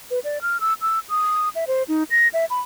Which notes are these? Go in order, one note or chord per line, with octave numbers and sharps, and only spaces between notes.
B4
D5
F6
E6
E6
D#6
E5
C5
D#4
A#6
E5
B5